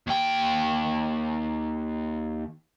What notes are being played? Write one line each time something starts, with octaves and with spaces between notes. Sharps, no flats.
D#2 G5